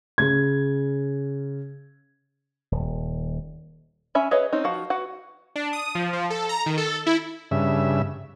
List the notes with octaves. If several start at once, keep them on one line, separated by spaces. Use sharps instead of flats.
C#3 G#6
D#1
C#4 E5 G#5 B5
G#4 B4 C#5 D#5 E5
C4 C#4 D#4
F3 F#4 F5
F#4 B4 F#5
D4
D#6
F3
F3
A4
A#5
D#3
A4
E4
G2 C#3 E5